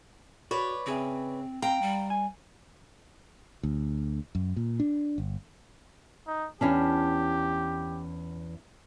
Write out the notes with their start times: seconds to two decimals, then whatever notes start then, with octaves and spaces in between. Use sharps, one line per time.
0.51 F#4 B4 C#5 D5
0.86 C#3 C4 G#4 E5
1.62 C4 F5 G5 A#5
1.82 G3
2.10 G#5
3.63 D2
4.35 F#2
4.56 A#2
4.80 D4
5.18 G1
6.27 D#4
6.61 E2 C#4 D4 G4